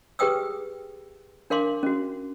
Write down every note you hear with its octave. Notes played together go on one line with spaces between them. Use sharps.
G4 G#4 B4 G5 D#6 E6
D4 A#4 F5 C6 D6
C#4 F#4